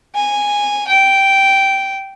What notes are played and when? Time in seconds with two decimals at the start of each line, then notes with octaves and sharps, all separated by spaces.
0.15 G#5
0.88 G5